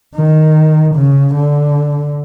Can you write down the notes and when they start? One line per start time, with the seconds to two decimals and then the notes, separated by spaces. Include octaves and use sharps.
0.16 D#3
0.95 C#3
1.35 D3